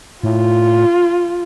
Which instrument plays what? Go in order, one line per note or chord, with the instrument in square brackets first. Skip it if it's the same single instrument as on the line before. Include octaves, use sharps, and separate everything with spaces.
[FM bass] A2 [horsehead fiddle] F4